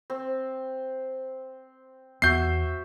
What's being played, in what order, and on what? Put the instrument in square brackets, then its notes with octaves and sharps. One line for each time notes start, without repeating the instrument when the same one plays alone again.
[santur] C4
[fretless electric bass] E2 B3 [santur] F#4 E5 [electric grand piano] G6 C7